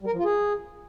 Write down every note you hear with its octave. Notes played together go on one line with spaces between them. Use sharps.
G3
A#4
F3
F4
G#4